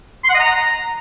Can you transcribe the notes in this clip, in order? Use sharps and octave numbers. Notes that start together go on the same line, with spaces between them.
C6
F#5
D#5
A#5